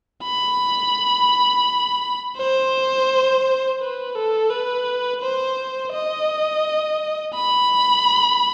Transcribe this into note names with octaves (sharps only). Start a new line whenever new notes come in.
B5
C5
B4
A4
B4
C5
D#5
B5